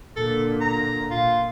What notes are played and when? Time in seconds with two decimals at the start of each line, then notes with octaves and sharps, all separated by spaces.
0.16 A#2 D3 A4
0.61 A#5
1.11 A#2 F4